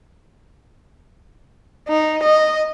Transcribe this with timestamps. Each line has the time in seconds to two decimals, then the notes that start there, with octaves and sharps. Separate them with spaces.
1.88 D#4
2.23 D#5